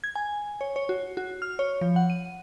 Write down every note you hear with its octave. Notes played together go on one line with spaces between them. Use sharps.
G#6
G#5
C#5
C#5
F#4
F#4
F6
C#5
F3
F#5
D#7